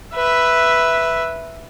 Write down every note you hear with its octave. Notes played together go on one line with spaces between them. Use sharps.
B4 E5